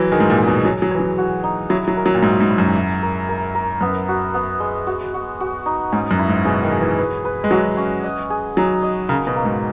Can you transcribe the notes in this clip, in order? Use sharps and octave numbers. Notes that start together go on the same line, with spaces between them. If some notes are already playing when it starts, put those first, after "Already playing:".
Already playing: E3 F#3
D#3 G#4
G#2
A#2
G#4
B2
F#3 C#5
F#3
E3 C#5
F#3
F#4
D#4
F#3 E4
F#3
A#4
F#3
A#2
G#2 E5
G#2
E4
F#2
E5
A#4
A#4
A#4
F#2 B3
F#4
B3
G#3
F#4
F#4
F#4
D#4
G#2 C#4
F#2
E4
G#2
B2 G#4
D#3
G#4
E3
B4
B4
G#3
F#3 F#4
C#4
D#5
G#4
F#3 D#4
D#5
C#3 A#4
B2
A#3
G#2